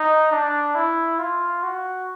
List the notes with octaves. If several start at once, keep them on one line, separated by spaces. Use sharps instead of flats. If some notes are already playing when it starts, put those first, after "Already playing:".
Already playing: D#4
D4
E4
F4
F#4